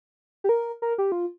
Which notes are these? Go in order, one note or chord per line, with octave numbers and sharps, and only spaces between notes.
G4
A#4
A#4
G4
F4